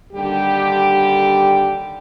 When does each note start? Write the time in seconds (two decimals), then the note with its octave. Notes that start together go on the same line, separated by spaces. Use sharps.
0.13 D#2 D3 G3 G4